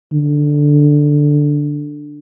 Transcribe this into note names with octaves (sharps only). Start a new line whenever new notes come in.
D3